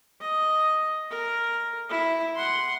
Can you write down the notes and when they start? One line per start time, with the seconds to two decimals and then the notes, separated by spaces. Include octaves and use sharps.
0.21 D#5
1.11 A#4
1.90 E4
2.36 F#5 C6